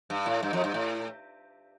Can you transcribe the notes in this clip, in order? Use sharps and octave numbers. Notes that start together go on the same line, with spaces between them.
G2
A2
G2
F2
G2
A2